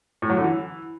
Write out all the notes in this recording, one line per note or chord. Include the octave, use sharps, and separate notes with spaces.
A2
F#3
D3
E3